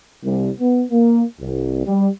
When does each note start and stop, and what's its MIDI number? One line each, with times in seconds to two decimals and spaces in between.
0.24 0.51 36
0.60 0.84 59
0.91 1.24 58
1.41 1.84 36
1.87 2.08 55